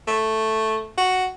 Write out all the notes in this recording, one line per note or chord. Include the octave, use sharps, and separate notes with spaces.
A3
F#4